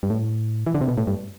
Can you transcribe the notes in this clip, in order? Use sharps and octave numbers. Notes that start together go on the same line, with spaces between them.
G2
A2
E3
D3
C3
B2
A2
G2